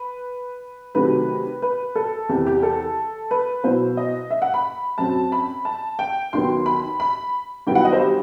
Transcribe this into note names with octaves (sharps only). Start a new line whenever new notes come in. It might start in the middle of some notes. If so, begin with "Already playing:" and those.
Already playing: B4
C3 D#3 F#3 A3 B4
B4
A4
E2 C3 E3 G4
G4
A4
B4
B2 F#3 B3 E4 C5
D#5
E5
F#5
B5
F#2 F#3 C4 A5
B5
A5
G5
D#2 D#3 F#3 B3 C6
B5
B5
G2 D#3 F#3 B3 E4 G5
F#5
D#5
C5
G4